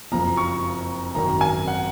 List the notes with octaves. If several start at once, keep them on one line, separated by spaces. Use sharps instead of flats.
F#1 F2 F3 A#5
C#6
G#1 F#2 D#3 F#3 A#5
G#5
F#5